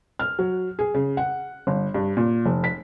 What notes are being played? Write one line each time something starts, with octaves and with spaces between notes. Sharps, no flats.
F6
F#3
G#4
C#3
F#5
G1
G2
A#2
F1
B6